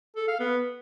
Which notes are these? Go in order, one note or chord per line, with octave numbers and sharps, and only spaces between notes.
A4
F5
B3